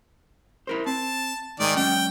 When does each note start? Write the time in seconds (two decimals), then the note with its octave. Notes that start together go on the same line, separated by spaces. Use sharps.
0.67 E4 A#4 C5
0.86 C4 A5
1.60 G#2 D#3 D5 G#5
1.76 F#3 G#3 C#4 G5